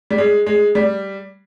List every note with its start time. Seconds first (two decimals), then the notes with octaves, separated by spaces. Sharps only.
0.10 G3
0.18 G#3
0.46 G#3
0.75 G3